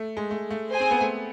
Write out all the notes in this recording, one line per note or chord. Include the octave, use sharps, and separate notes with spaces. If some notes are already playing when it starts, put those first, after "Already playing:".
Already playing: A3
G#3
A3
A3
G#4 C5 G#5
C4
B3
A3